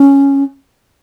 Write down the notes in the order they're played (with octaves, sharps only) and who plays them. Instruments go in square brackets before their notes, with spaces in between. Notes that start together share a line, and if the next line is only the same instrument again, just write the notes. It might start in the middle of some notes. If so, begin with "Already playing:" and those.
Already playing: [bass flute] C#4